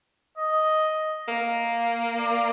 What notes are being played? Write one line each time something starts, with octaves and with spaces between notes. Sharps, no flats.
D#5
A#3
D5